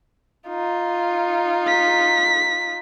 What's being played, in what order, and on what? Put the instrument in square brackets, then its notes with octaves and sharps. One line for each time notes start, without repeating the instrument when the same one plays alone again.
[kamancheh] D#4 F4
[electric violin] B6